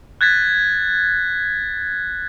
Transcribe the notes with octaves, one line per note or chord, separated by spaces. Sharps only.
F#6 G#6 A6 B6